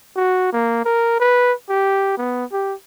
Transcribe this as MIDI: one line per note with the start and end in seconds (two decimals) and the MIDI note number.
0.16 0.49 66
0.53 0.85 58
0.85 1.15 70
1.20 1.53 71
1.70 2.17 67
2.18 2.45 59
2.52 2.74 67